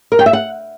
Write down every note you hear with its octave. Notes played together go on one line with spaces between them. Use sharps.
A#4
G5
E5
F#5